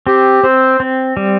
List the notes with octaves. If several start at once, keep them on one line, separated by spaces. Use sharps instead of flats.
C4 G4
C4 C5
C4
G3